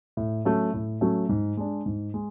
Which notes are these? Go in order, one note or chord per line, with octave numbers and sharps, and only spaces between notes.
A2
F#3 A3 C#4
A2
F#3 A3 C#4
G#2
G#3 D4
G#2
G#3